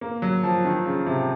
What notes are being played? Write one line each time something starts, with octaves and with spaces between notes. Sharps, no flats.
A#3
F#3
F3
D#3
C#3
C3